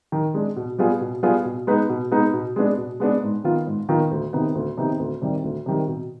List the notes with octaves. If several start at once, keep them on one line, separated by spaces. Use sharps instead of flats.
D#3
G#3 D4
B2
G3 B3 F4 G#4
B2
G3 B3 F4 G#4
B2
G#3 B3 D#4 B4
B2
G#3 B3 D#4 B4
B2
G#3 B3 D4
B2
G#3 B3 D4
G#2
D#3 B3 F4
G#2
D#3 B3 F4
D2
C3 D#3 B3 D#4
D2
C3 D#3 B3 D#4
D2
C3 D#3 G3
D2
C3 D#3 G3
B2